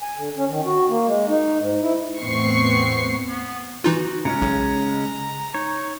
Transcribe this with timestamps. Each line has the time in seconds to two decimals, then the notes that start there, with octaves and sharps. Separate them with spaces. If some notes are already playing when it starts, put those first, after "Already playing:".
0.02 G#5
0.17 D3
0.37 C#4
0.49 D#3
0.66 F#4
0.89 A#3
1.07 G#3
1.29 D#4
1.60 G#2
1.82 E4
2.21 E2 A2 B3 C4 C#6 C7
3.29 B3
3.84 E3 D#4 F4 F#4
4.25 C#3 G#3 C#4 A#5
4.42 B1
5.54 D#4 C#5